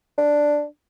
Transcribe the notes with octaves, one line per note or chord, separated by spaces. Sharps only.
D4